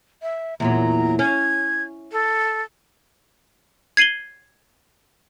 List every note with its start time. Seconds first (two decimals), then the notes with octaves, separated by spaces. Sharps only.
0.22 E5
0.60 E2 A#2 F#3 A#5
1.19 C#4 G#6
2.12 A4
3.97 G#6 C7 D#7 F#7 G7